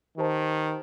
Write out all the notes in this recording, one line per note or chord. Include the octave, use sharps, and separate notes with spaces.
D#3 G4 C5 A5